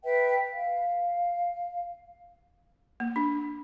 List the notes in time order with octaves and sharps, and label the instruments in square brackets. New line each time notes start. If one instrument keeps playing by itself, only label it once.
[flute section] B4 E5 G5
F5
[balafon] A#3
D4